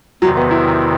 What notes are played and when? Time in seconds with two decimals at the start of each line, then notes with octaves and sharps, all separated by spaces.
0.22 E2 C3 D#3 F#3
0.37 B3
0.51 E4